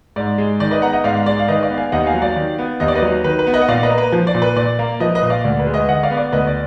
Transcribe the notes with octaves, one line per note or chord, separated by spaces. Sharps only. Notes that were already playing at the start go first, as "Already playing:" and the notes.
G#2 D5
G#3
D#3 D5
B4 D#5
B3 F#5 A#5
D#5 F#5
G#2 D5 F5
G#3 D5
F5
D#3 B4 D#5
D5 F5
B3
F5 G#5
D#2 D#5 F#5
F5 G#5
F#3
D5 F5
D#3
B3
D#2 D#5
D5
B4 D#5
F#3
D#3 B4
B4
B3
B4 D#5
F#5
A#2 D5 F5
B4 D#5
A#3
B4
F3
D5
A#2
B4
A#2 D5
A#3
F3 B4 D#5
B4 D#5
A#2
D5 F5
D2 D5
B4
G#3
B4 D#5
D3 D#5 F#5
D5 F5
B3
D5
D2 B4 D#5
D5